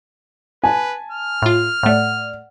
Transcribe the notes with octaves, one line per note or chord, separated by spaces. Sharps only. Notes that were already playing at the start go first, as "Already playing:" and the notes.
B4 G#5 A5
F6
A2 F4
A2 A3 D5 F#5